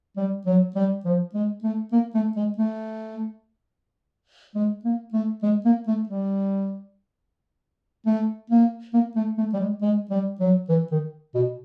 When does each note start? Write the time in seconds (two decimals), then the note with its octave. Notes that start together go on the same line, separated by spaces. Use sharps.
0.17 G3
0.46 F#3
0.75 G3
1.05 F3
1.34 G#3
1.63 A3
1.92 A#3
2.14 A3
2.36 G#3
2.58 A3
4.55 G#3
4.84 A#3
5.13 A3
5.43 G#3
5.65 A#3
5.87 A3
6.09 G3
8.06 A3
8.50 A#3
8.93 A#3
9.16 A3
9.38 A3
9.53 G3
9.59 G#3
9.81 G#3
10.10 G3
10.40 F#3
10.69 E3
10.91 D#3
11.34 B2